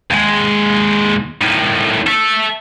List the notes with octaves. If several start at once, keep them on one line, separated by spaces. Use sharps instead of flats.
D#2 G#3
A2 D#3
A4 E5